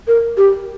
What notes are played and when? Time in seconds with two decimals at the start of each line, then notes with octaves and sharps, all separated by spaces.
0.08 A#4
0.38 G4